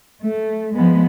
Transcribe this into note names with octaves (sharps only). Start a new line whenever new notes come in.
A3
F3 G#3 B3